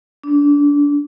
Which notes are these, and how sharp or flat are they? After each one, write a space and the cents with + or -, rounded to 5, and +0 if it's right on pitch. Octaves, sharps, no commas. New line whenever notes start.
D4 -25